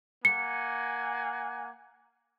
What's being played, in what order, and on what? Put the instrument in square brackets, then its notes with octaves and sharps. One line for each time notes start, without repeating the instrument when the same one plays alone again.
[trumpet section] A#3 F#5 G#5 [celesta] C#7